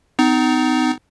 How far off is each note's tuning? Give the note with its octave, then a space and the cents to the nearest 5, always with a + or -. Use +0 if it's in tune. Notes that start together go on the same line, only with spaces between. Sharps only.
B3 +45 D#4 +0